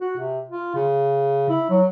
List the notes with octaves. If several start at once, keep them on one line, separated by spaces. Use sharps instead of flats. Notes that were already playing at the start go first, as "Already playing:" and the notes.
F#4
C3
F4
C#3
E4
F#3